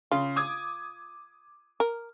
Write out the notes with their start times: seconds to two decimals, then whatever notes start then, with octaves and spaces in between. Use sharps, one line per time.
0.11 C#3 F4
0.36 D6 D#6 G#6
1.80 A#4